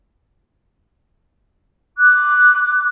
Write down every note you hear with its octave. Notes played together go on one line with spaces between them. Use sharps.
D6 F#6